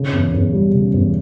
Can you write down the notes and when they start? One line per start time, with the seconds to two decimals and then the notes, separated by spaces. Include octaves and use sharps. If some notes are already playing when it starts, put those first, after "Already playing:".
Already playing: C#3
0.13 E2
0.34 E2
0.53 G3
0.74 C#3
0.94 E2